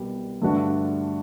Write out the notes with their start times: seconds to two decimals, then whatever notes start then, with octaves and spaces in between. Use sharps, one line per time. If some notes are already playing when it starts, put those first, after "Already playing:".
Already playing: C2 B2 G3
0.42 G2 D3 A3 D4 F#4